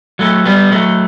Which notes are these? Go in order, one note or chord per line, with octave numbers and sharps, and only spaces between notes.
F#3 A3
G3 B3
F#3 A3